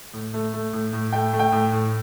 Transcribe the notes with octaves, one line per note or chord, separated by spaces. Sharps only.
A2
A3
A3
A2
A2
A3 G5
A3
G5
A2
A2